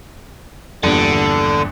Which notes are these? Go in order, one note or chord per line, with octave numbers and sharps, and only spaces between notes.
A#1 E2 G2 D3